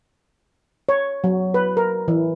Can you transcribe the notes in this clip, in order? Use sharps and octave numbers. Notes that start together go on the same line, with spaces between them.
C#5
F#3
B4
A#4
E3